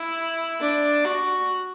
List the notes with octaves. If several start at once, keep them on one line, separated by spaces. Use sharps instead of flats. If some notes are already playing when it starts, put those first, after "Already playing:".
Already playing: E4
D4
F#4